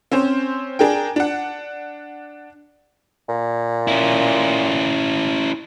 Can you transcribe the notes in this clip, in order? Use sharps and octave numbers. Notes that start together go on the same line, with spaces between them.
C4 C#4 C5
D4 G#4 A#4 G5
D4 F#5
A#2
C#4 E4